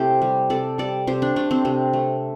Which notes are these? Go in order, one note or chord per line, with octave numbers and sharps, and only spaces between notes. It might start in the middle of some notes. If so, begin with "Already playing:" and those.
Already playing: C3 A3 E4 G4 C5
G3
C3 A4 D5
G3 A4 D5
C3 G4 C5
D4
A3 D4
C4
C3 C4
A3